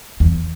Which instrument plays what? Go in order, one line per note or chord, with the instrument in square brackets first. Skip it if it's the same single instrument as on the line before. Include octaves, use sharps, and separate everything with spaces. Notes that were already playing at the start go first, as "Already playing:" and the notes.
[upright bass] E2